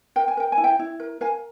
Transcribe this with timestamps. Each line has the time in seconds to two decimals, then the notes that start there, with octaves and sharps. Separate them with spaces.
0.16 A#4 G5
0.28 G#5
0.37 A#4 G5
0.52 G#5
0.58 E4
0.64 E5 G5
0.79 E4
1.00 A#4
1.21 A#4 F5 G#5